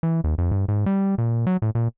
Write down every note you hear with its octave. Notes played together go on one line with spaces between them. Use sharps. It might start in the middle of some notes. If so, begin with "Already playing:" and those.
E3
D#2
F2
G2
G#2
G3
A#2
F#3
A2
A#2